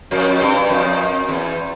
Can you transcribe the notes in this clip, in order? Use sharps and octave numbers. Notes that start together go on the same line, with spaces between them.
F2
G2
F2
E2